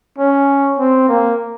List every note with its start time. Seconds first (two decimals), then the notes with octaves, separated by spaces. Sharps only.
0.18 C#4
0.78 C4
1.08 A#3